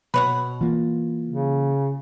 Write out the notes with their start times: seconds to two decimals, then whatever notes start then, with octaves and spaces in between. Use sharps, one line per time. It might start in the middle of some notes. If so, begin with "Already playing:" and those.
0.14 B2 B4 C#5 F#5
0.61 E3 A#3 F4
1.28 C#3